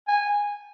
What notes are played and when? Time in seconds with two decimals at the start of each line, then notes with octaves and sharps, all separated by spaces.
0.08 G#5